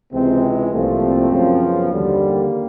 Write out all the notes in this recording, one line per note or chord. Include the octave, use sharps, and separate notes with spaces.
C#2 C3 E3 G#3 C4
C2 A#2 F3 A3
C4
F#2 C#3 F3
B3
D#2 D3 G3
A#3